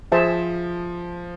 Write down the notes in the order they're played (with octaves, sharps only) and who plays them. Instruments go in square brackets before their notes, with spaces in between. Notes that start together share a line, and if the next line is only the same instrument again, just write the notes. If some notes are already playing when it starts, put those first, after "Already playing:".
[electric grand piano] F3 [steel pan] G#4 C5 E5 A5